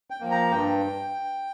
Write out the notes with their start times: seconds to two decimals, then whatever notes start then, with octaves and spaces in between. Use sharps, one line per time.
0.10 G5
0.21 F3 A#3
0.31 A#5
0.51 G2 G5